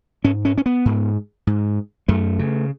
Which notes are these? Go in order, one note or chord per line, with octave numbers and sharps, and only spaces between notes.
G#2 C#4
C#4
C#4
B3
G#2
G#2
F#2 A3
C#3